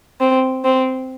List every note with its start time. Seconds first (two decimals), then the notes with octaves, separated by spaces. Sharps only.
0.20 C4
0.64 C4